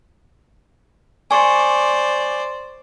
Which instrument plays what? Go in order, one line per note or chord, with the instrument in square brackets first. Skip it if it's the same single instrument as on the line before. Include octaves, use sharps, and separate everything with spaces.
[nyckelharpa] C5 D5 [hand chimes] G#5 C#6